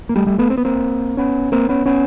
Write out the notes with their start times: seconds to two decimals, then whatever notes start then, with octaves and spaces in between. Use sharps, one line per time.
0.09 A#3
0.16 G3 A3
0.26 G3 A3
0.38 A3 B3
0.50 C4
0.57 B3
0.65 A#3 C4
1.17 B3 C#4
1.52 A#3 C4
1.69 B3 C#4
1.86 B3 C#4